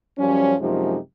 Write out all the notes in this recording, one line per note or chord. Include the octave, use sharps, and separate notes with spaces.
F#2 F3 G3 C#4
F#2 C3 F3 G#3 D#4 G4